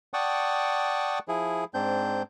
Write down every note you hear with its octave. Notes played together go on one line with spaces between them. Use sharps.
D5 F#5 G5 A5 C#6 D#6
F3 E4 G#4
G#2 C4 D4 G6